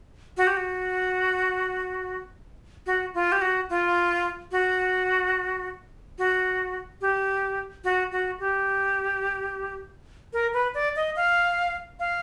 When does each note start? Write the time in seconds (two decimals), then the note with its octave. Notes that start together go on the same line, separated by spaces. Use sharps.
0.37 F#4
0.47 G4
0.57 F#4
2.86 F#4
3.14 F4
3.32 G4
3.41 F#4
3.70 F4
4.52 F#4
6.18 F#4
7.01 G4
7.84 F#4
8.12 F#4
8.40 G4
10.33 A#4
10.54 B4
10.74 D5
10.96 D#5
11.16 F5
12.00 F5